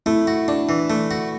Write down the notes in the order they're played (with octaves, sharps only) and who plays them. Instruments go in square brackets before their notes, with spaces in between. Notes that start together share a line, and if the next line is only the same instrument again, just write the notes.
[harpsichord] A3 [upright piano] E4
[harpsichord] F#4
D4
E3
A3
F#4